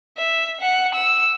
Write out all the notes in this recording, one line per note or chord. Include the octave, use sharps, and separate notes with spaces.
E5
F#5
E6